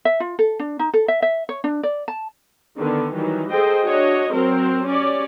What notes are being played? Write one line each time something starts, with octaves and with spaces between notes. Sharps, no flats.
E5
F4
A4
D4
D#4
A4
E5
E5
C#5
D4
D5
A5
D3 D#3 B3
D#3 E3 F#3 G3
G#4 A4 C5 D#5 G5
D4 F#4 C#5 D#5
F#3 C4 A#4 C5
C#4 G4 C#5 D5